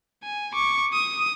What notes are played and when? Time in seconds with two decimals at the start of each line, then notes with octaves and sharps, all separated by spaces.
0.24 G#5
0.53 C#6 D6
0.93 D#6